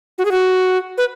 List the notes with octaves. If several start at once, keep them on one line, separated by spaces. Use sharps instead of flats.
F#4
G#4
F#4
B4